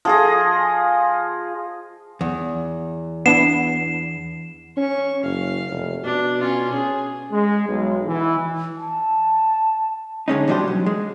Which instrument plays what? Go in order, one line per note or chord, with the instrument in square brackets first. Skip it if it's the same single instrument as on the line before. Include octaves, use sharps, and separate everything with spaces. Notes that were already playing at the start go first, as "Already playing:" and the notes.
[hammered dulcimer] F3 G#4 D#5
[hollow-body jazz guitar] E2
[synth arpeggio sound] B3 D4 E4 [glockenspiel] C7 E7
[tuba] C#4 [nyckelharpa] C#6
[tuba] F#1 [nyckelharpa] F5
[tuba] F1
[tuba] B2 [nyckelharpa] D4
[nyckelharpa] C#4 F4
[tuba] C#4 [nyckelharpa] G#4
[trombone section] G#3
B1
E3
[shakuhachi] A5
[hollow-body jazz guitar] D3 G#3 C#4 D#4
B2 E3 G3 D4 G4 C5
F#3
G#3